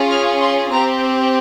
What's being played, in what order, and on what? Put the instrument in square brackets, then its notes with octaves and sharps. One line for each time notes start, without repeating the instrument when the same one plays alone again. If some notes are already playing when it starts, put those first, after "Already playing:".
Already playing: [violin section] C#4 F4 G#4
F6
C6
C4 G4 A#5